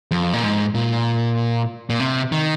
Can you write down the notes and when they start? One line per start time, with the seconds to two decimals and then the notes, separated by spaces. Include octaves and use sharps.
0.11 F2
0.33 A#2
0.43 G#2
0.75 A#2
1.90 A#2
2.00 C3
2.32 D#3